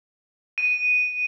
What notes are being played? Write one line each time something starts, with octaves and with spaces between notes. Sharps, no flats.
D#7